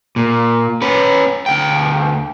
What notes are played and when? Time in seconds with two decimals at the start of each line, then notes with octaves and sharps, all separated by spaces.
0.16 A#2
0.82 C#4 B4
1.46 D2 G5